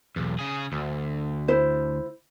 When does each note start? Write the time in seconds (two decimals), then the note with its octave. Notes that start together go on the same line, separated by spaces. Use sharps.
0.16 B1 E2
0.39 C#3 G#4
0.72 D2
1.48 E4 C5